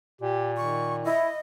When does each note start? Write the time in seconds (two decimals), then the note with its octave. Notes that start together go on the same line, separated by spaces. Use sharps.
0.21 A#2 G4
0.57 D#3 C#6
1.05 E4 D#5